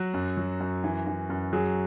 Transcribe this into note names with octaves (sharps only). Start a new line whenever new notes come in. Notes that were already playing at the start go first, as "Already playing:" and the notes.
Already playing: F#3 F#4
F#2
F#3
F#2
E3
E3
F#2
F#3 G#4